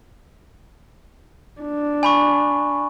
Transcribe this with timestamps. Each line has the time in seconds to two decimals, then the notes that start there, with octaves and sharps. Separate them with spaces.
1.61 D4
2.03 G#5 B5 C#6